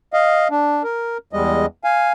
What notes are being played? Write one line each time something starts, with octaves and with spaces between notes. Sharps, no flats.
D#5 F5
D4
A#4
E2 G3 G#3 D#5
F5 G#5